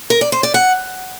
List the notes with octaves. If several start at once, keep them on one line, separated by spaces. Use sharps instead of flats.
A#4
D5
C5
D5
F#5